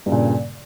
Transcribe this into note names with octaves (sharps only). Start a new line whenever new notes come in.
G2 A#2 C#3